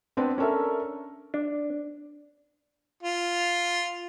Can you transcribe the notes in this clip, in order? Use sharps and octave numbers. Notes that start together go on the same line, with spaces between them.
B3 C4 D4 B4 D5
C#4 D4 A4 A#4 E5
D4
F4